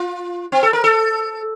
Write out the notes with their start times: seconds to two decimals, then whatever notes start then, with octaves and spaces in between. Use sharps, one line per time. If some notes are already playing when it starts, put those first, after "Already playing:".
Already playing: F4
0.52 C4
0.63 A4
0.73 A#4
0.84 A4